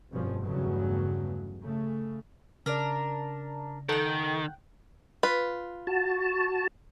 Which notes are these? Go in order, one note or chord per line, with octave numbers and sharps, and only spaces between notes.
F1 G2 B2 F3 C#4
G1 E2 G2 C#3 F#3 A3
C#3 A3
C#3 D4 A#4 D5
D#3 A4 F#5 G5
F4 B4
F#4 A5